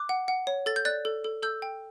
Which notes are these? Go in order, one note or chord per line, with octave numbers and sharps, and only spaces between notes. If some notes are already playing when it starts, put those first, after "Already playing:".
Already playing: D6 F#6
F#5
F#5
C#5
A4 A6
G6
D5 F#6 A6
A4
A4
A4 E6 G6
G5